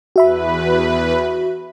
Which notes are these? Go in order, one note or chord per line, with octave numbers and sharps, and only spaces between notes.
E2 F#4 B4 E5 B5